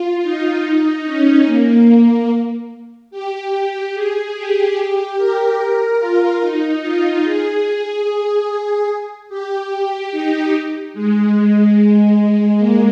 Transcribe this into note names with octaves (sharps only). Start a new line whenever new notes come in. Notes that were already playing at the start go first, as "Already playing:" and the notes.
Already playing: F4
D#4
C#4
A#3
G4
G#4
G4
A#4
F4
D#4
F4
G#4
G#4
G4
D#4
G#3
G#3
A#3